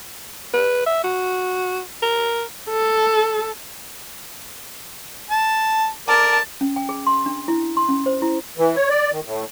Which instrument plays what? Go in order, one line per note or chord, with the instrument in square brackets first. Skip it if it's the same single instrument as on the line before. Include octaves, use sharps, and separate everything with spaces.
[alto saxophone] B4
E5
F#4
A#4
[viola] A4
[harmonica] A5
[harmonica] A#4 D5 [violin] A5
[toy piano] C#4
G5
G#4
C6
D4
E4
C6
C#4
C5
E4
[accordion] E3
C#5
D5
D#3
A2